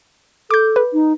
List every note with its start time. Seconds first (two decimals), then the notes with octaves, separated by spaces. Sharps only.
0.51 A4 D6 G6
0.76 B4
0.93 D#4